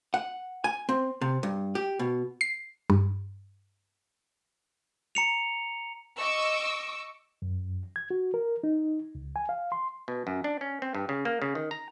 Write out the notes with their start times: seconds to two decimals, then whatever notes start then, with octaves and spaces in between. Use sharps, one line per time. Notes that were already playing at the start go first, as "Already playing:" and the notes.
0.14 F#5
0.64 G#5
0.89 C4
1.21 C3
1.43 G2
1.75 G4
1.99 B2
2.41 C7
2.90 G2
5.15 A#5 C#7 F7
6.19 D#5 C#6 D6 E6
7.42 F#2
7.96 G#6
8.11 F#4
8.34 A#4
8.64 D#4
9.15 C#2
9.36 G#5
9.49 F5
9.72 C6
10.08 B2
10.27 F#2
10.44 D4
10.61 C#4
10.82 C4
10.95 G2
11.09 C#3
11.25 A#3
11.42 C#3
11.55 D#3
11.71 A#5